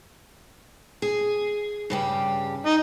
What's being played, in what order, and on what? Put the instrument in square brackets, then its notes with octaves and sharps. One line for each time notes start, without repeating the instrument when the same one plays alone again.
[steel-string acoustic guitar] G#4
G2 C#3 G4
[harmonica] D#4